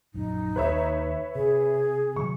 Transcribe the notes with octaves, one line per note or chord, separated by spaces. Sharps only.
A#1 F#2 D#4
D#2 B4 C#5 E5
C3 G#4
C3 D#3 F#3 C#6